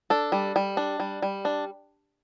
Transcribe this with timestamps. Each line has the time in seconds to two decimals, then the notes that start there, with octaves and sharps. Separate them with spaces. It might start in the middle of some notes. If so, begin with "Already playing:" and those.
0.10 D4 A4
0.32 G3
0.56 G3
0.77 D4
1.00 G3
1.22 G3
1.45 D4